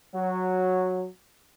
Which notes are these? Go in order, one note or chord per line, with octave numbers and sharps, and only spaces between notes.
F#3